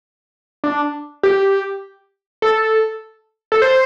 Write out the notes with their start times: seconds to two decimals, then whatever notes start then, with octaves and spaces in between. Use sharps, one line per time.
0.64 D4
1.23 G4
2.42 A4
3.52 A4
3.62 C5